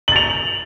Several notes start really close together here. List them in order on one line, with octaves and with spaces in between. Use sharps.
F#7 A6 F7